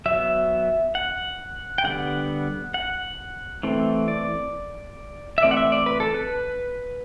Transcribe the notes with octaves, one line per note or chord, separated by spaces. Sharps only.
F#3 B3 E5
F#5
G5
D3 G3 B3 F#5
F#5
E3 A3 C4
D5
E5
E3 A3 C4 D5
F#5
E5
D5
B4
A4
B4